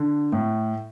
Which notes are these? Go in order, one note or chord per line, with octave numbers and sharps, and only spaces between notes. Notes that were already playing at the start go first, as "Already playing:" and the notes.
Already playing: D3
A2